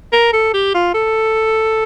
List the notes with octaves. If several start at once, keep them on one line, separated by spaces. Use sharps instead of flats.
A#4
A4
G4
F4
A4